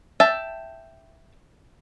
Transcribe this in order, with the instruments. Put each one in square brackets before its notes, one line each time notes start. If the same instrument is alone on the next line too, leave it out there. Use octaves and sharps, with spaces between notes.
[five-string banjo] E5 G5 A5